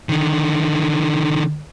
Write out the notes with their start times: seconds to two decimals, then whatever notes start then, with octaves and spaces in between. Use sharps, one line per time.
0.09 D3 D#3